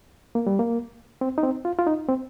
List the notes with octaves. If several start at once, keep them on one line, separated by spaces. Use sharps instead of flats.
A#3
G3
A#3
C4
D#4
C4
F4
F4
D#4
C4